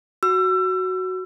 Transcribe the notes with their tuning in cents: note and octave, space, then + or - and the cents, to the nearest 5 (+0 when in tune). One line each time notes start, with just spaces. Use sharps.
F#4 +5 E6 +30